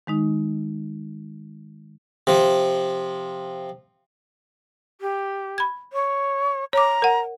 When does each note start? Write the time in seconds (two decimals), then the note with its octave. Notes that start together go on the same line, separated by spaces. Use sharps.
0.07 D#3 G#3 D#4
2.27 C3 F3
5.01 G4
5.58 B5 G#6
5.93 C#5
6.73 C#5 A#5 D6
7.02 A#4 F#5